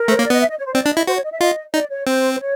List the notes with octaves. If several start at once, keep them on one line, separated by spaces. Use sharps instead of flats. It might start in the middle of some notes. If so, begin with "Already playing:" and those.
Already playing: A#4
A3 C5
A#3 C#5
D5
B3 D#5
E5
D#5
C#5
C5
C4 D5
D4
D#5
E4
F#4 C5
C#5
D#5
E5
F4 D#5
D#4 D5
C#5
C4 C5
C5
C#5